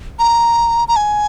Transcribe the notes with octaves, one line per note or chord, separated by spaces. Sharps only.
A#5
A#5
G#5